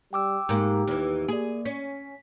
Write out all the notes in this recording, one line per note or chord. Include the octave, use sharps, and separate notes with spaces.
G3 G5 D6 E6
G#2 A#3 G4
D#2 E3
A#3 G#4 D5
C#4 B6